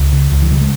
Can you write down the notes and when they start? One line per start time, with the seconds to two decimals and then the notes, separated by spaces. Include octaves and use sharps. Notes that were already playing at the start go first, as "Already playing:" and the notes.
Already playing: C#2
0.12 C#3
0.31 C#2
0.42 E3
0.51 C#3 G3
0.61 G#3